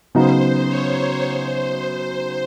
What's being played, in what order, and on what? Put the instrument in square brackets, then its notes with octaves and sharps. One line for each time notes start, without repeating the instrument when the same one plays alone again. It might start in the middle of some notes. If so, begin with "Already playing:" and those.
[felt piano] C#3 F#3 B3 D#4 [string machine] C5
[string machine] C#5
C5